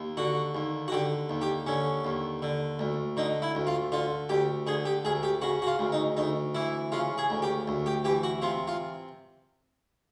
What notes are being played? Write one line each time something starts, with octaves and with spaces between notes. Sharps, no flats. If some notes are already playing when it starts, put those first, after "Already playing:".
Already playing: D#2
D3 F#4
D#2
F#4
D3 G4
D#2
G4
D3 C#4
D#2
D3
D2
D3 D#4
E4
D2
F4
D3 F4
D2 G4
D3 G#4
G4
D2 G#4
G4
C#3 F#4
F#4
F4
D2
D#4
D2 D#4
E3 E4
C#3 F4
G#4
D2
G4
D2
G4
E3 G4
F#4
C3 F4
F4